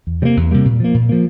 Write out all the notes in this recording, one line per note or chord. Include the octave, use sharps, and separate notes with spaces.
E2
C3 G3 A#3
E2
C3 G3 A#3
A#2
F3 A#3
A#2
F3 A#3